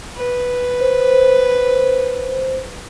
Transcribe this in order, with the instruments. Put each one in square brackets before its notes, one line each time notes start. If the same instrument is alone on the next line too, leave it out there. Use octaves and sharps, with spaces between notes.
[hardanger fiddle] B4
[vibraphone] C5